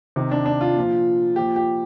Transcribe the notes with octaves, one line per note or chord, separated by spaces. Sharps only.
C3 D#3
D4
D4
F4
A#2 F3
A#2 F3 G4
G4